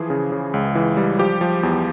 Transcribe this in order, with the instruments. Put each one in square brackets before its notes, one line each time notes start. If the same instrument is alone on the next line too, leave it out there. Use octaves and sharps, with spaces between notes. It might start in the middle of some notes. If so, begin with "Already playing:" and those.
Already playing: [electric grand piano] E3 F3 G#4
C#3
C#3
C#2
E3
G3
F3 G4
F3
E2